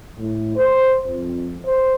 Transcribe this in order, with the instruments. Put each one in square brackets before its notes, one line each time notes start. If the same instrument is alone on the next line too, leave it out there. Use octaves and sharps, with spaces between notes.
[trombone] A2
C5
F2
C5